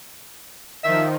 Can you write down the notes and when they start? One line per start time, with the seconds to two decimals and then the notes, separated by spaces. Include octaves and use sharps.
0.84 D#3 F3 E5